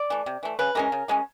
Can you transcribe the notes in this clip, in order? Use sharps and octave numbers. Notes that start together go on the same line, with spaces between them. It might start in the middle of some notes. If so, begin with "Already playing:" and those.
Already playing: D5
E3 A3
C3
E3 A3
C#3 B4
E3 G#3 C#4 A#4
C#3
E3 G#3 C#4